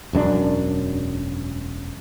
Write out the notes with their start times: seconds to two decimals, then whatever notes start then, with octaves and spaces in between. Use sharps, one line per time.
0.13 E1 F#2 G#3 D4